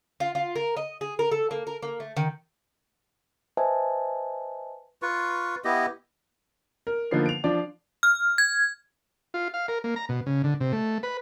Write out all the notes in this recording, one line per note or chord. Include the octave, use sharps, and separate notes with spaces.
F4
F4
A#4
D#5
G#4
A#4
A4
A#3
A#4
A#3
A3
D#3
B4 C5 D#5 E5 G#5 A5
F4 B4 C#6
B3 E4 G4 D#5
A#4
D3 F3 A#3 B3 D#4 C7
D7 F7
F3 D4 D5
F6
G#6
F4
F5
A#4
A#3
A#5
B2
C#3
D3
C3
A3
B4